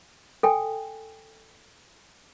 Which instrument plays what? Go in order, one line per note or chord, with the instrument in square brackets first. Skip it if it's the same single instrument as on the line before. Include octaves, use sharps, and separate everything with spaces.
[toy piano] A4 G5 G#5